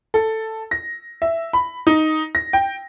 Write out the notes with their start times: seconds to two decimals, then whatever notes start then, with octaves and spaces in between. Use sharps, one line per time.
0.14 A4
0.71 A#6
1.22 E5
1.53 B5
1.87 D#4
2.35 A#6
2.53 G5